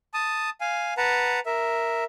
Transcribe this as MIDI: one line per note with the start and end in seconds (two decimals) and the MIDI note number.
0.14 0.50 81
0.14 0.50 87
0.61 0.94 77
0.61 0.94 80
0.97 1.40 71
0.97 1.40 78
0.97 1.40 81
0.97 1.40 82
1.46 2.04 70
1.46 2.04 76